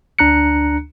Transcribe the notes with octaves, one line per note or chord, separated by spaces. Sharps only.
D2 D4 A#5 F#6 C#7